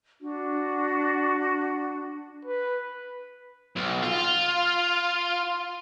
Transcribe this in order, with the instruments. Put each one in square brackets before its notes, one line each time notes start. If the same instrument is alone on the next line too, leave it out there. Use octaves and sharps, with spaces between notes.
[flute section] D4 F#4
[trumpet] B4
[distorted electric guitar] B1
F4